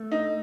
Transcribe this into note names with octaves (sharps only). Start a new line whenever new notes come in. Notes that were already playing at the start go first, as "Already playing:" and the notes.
Already playing: A3
D#4